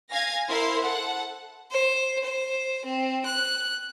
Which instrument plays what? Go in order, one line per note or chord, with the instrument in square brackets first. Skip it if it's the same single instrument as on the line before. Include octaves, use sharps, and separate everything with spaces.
[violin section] F5 G#5 G#6 A#6
E4 A#4 C5 F5 C6
A4 F#5
[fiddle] C5
C5
C4
F#6